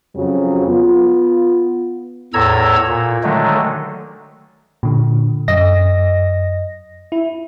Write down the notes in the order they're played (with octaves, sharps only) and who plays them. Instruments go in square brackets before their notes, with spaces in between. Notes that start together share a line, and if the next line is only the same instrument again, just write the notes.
[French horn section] F2 C#3 F#3
B3 F4
[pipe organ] E2 A2 A4 A#5 E6 G#6
A#2
D3 D#3 F#3 G#3 A3
[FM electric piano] A#2 D3
F#2 D#5 A#6
E4